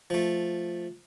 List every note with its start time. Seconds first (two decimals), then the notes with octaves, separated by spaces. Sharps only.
0.10 F3 A3